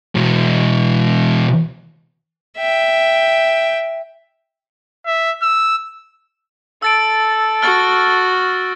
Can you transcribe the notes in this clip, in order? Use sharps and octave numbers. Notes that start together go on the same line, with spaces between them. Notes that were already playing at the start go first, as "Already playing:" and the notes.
E2 B2
E5 G5
E5
E6
A4 E6 A6 D7
F#4 F6 A6